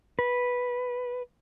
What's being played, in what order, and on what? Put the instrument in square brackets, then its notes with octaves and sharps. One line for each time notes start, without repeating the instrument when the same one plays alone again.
[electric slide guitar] B4